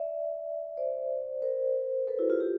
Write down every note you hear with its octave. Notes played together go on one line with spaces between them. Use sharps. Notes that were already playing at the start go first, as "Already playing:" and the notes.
Already playing: D5 E5
C5 D5
A#4 C5
A4 B4
E4 F#4
F4 G4
F4 G4